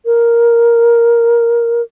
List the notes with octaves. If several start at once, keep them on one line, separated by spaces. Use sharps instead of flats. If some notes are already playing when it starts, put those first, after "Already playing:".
A#4